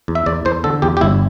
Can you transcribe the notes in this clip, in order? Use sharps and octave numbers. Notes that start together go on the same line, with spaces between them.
E2
E5
E2 D5
E2 C5
D3 A4
E2 G4
G4
G1 E4